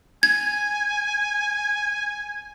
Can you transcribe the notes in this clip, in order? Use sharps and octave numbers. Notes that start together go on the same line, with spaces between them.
G#5 G#6